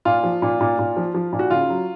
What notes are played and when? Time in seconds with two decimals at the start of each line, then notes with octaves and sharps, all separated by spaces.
0.05 A#2 F4
0.24 F3
0.42 A#2
0.61 A#2
0.79 A#2
0.97 F3
1.15 F3
1.33 A#2
1.39 F#4
1.50 C#3 F4
1.70 F#3